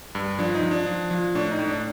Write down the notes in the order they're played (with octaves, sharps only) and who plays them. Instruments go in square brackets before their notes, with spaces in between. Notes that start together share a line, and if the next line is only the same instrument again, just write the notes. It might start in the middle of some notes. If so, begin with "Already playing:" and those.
[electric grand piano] G2
F3 D4
D#4
F3
D4
F3
F3
A2 D4
D#4
A2
D4